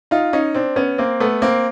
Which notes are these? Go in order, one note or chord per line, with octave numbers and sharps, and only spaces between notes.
D#4 F4
C#4 D#4
C4 D4
B3 C#4
A#3 C4
A3 B3
A#3 C4